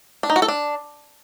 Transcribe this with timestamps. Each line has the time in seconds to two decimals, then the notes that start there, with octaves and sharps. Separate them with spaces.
0.23 D4
0.30 D#4
0.36 F#4
0.42 A4
0.48 D4